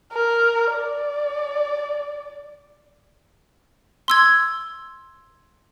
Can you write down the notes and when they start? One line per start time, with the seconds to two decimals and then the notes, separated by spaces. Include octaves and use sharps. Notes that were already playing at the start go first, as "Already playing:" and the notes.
0.13 A#4
0.74 D5
4.08 C6 E6 G#6